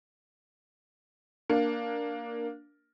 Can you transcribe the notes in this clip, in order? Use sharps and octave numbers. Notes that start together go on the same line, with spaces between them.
A#3 D4